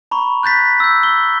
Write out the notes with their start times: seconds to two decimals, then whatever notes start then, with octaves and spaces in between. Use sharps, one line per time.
0.11 A#5 B5 C#6
0.43 F#6 G6 A6 B6
0.80 E6 G6
1.03 G7